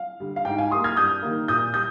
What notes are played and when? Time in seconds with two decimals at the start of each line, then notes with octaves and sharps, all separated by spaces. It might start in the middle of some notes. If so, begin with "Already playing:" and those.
Already playing: F5
0.20 D3 G3
0.36 F5
0.45 G#2 G5
0.58 F5 G#5
0.71 G3 A#3 C6 D#6
0.84 F6 G#6
0.96 G2 D#6 G6
1.22 D#3 G3 A#3
1.48 A#2 D#6 G6
1.74 G3 D#6 G6